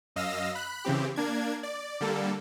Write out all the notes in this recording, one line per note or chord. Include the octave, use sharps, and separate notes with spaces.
F#2 D#5 F5 E6 A#6
B5 F#6
C#3 E3 C4 G4
A#3 D4 G#6
D5
D3 G3 A#3 A4